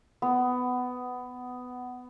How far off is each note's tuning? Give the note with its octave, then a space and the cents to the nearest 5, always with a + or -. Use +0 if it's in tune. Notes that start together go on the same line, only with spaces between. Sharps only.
B3 +15